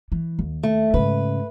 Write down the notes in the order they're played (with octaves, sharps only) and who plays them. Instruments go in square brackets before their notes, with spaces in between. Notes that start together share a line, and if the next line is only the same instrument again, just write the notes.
[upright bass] E3
D#2
[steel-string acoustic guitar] A3
[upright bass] G#2 C#3 [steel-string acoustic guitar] B4